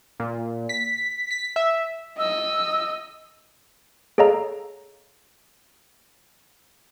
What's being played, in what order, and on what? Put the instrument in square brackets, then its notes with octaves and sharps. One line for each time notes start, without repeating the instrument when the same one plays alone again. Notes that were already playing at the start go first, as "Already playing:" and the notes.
[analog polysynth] A#2
B6
B6
E5
[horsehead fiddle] D#5 [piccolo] E6
[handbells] G#4 A4 C#5 D#5 F5 A#5